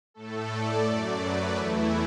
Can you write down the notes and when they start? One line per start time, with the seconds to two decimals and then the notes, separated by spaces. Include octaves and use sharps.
0.14 A2 A3 A4
0.51 D5
0.85 F#2 F#3 A3 D5
1.22 B4
1.56 E2 E3 A3 E4